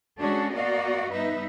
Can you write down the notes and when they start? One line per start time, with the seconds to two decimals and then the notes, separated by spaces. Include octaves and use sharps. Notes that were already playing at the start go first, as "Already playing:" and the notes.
0.19 G#3 C#4 D4 F#4 G#4 A4
0.53 A#3 B3 F#4 D5 D#5 F5
1.11 G2 B3 D#4 B4 E5